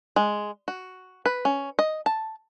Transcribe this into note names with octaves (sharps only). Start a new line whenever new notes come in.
G#3
F#4
B4
C#4
D#5
A5